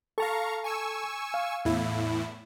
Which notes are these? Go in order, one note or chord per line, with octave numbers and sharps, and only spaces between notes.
A4 F5 A5 A#5 C#6
G#5 C#6 E6
F5
E2 A2 E4